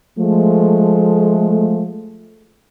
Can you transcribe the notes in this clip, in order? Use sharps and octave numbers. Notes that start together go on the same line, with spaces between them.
F3 G#3 A3